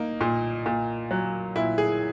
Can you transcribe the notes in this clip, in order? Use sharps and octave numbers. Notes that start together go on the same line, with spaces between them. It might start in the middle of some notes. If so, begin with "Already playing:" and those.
Already playing: A#3 D#4
A#2
A#2
F#3
A#2 E4
G#4